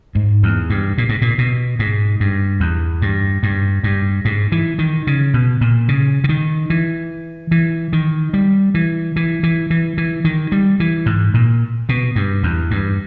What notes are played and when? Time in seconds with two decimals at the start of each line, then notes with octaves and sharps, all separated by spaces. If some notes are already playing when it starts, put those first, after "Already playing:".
0.15 G#2
0.43 E2
0.70 G2
0.98 A#2
1.09 G#2
1.22 A#2
1.38 B2
1.79 G#2
2.20 G2
2.60 E2
3.02 G2
3.43 G2
3.83 G2
4.25 G#2
4.52 E3
4.79 D#3
5.07 C#3
5.34 B2
5.61 A#2
5.88 C#3
6.24 C#3
6.29 D#3
6.70 E3
7.51 E3
7.93 D#3
8.34 G3
8.74 E3
9.16 E3
9.43 E3
9.70 E3
9.98 E3
10.25 D#3
10.52 G3
10.80 E3
11.06 G#2
11.34 A#2
11.89 B2
12.16 G2
12.43 E2
12.71 G2